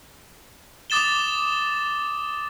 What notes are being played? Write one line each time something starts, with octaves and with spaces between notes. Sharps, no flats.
D6 D#6 A6 E7 G7